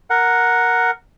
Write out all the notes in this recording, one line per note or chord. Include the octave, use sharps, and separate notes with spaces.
A#4 F#5